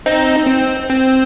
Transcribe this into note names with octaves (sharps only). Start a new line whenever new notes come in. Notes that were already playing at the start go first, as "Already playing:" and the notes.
C4 D#4
C4
C4